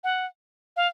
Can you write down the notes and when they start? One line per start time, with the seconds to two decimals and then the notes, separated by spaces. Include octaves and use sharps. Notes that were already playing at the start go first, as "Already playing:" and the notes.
0.04 F#5
0.77 F5